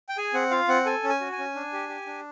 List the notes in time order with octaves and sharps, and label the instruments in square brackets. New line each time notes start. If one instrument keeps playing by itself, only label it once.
[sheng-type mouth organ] G5
G#4 G#5
C4 F#5
F4 F5
C4 F#5
A4 G#5
C#4
G#5
F#4
G#5
C#4
D4
G4
G4
D4